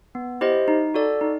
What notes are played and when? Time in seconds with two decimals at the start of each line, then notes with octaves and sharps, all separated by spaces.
0.15 B3
0.41 E4 G4 C5 D#5
0.68 D#4
0.94 F#4 A4 D5
1.21 D#4